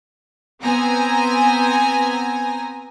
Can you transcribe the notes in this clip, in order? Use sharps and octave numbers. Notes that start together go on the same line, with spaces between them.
B3 C4 G#5 A#5